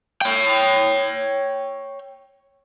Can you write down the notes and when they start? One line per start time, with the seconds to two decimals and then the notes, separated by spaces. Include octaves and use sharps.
0.21 C#5 G5